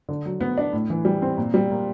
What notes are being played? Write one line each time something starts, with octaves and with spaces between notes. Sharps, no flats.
D3
F#3
B3
D4
A2
E3
G3
C4
A#2
G3
A#3